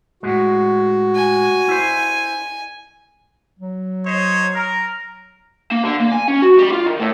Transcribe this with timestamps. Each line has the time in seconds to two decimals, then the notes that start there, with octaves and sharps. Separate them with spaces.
0.23 A2 G#3 F#4
1.16 G#5
1.68 E4 C5
3.59 F#3
4.06 C5 C#5 D#5
4.55 A#4
5.72 A#3
5.84 D3
6.00 A#3
6.12 G#5
6.28 C#4
6.42 F#4
6.58 G3
6.72 F4
6.86 D#3
7.00 A2